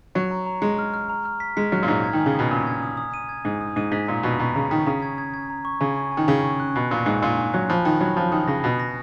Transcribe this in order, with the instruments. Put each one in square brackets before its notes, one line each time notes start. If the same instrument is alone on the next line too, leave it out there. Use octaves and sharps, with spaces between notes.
[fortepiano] F#3 [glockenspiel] C#6
[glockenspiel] A#5
A#5
[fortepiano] G#3 [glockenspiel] A#5
[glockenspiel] F6
F6
A#5
F6
B6
[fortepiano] G#3 [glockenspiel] B6
[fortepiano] F#3 [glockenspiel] F6
[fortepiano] A#2
[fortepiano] G#2 [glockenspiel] A#5
[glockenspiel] G#6
[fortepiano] D#3
[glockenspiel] G#5
[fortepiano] C#3
[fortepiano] B2 [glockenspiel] D#6
[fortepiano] A#2 [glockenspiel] G#5
[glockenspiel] G#6
D#6
D#6
D#7
G#6
[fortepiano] G#2 [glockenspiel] G#5
[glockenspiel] D#6
[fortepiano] G#2 [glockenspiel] D#7
[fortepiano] G#2 [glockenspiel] B6
[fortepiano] A#2 [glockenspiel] A#5
[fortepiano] B2 [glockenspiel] C#6
[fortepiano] B2 [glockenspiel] A#5
[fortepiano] C#3 [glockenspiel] A#5
[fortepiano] D#3 [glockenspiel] B6
[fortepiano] C#3 [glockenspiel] A#5
[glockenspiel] G#6
G#6
G#6
A#5
C#6
[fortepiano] C#3 [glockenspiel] G#5
[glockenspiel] C#6
G#5
[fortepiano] D#3
[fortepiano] C#3 [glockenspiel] G#5
[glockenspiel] C#6
F#6
[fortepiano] B2 [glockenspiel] F#6
[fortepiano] A#2 [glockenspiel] F#6
[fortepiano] G#2 [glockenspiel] G#5
[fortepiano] A#2 [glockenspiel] G#5
[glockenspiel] G#5
[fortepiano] F#3 [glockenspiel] F#6
[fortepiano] F3 [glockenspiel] B5
[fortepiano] D#3 [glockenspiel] B5
[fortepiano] F#3 [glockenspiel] B5
[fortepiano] F3 [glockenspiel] B5
[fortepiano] D#3 [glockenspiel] D#6
[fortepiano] C#3 [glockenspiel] A#6
[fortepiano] B2 [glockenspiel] A#6
[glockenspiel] A#6